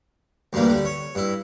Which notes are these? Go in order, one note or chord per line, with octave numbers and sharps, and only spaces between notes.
D2 G2 E3 G3 A#3
D3 G3
C#5
G2 E4